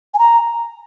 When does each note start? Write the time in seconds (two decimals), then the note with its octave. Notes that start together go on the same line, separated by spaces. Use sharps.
0.14 G#5
0.19 A#5